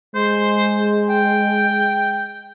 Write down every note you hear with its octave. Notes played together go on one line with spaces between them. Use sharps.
G#3 C5
G5